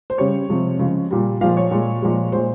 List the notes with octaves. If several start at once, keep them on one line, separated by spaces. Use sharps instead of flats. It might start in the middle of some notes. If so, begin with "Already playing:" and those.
C5
C#3 G3 C#5
C3 F3 G#3
C#3 F3 G#3
A#2 G3
A#2 F3 G#3 F5
C#5
A#2 G#3
A#2 F3 G#3
A#2 G#3 C5